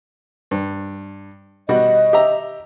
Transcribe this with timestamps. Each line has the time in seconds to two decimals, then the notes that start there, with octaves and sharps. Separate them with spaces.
0.51 G2
1.69 B2 G3 F#4 D#5
2.13 G4 E5 A#5